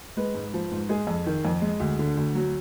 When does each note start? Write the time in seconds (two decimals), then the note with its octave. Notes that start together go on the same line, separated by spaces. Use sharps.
0.17 G#3 B4
0.35 G#2
0.54 F3
0.72 G#2
0.89 G#3 G#4
1.07 F2
1.26 D#3
1.45 F2
1.62 G#3
1.80 D2
1.99 D3
2.17 D2
2.35 F#3